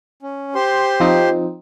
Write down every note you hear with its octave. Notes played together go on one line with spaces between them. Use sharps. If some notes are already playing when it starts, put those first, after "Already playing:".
C#4
G4 C5 C6
F3 C4 D#4